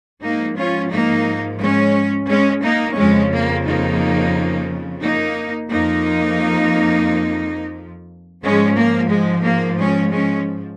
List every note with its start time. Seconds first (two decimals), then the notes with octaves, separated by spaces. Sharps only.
0.23 G#2 F3 A#3 D#4
0.58 C#4 F4
0.92 A#3 D#4
1.60 G#3 C#4
2.28 G#3 C#4
2.63 A#3 D#4
2.96 F2 C#3 F3 G#3 C#4
3.31 A#3
3.65 A#3 D#4
5.02 A#3 D#4
5.70 F2 F3 A#3 D#4
8.42 G#2 F3 G#3 C#4
8.77 A#3
9.11 G#3
9.45 A#3
9.79 G#3 C#4
10.13 G#3 C#4